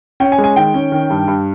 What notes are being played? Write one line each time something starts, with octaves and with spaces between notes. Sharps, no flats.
C#4 G5
G#5
G#3
G#5
D#3 G5
C#4
D#3
G2
G2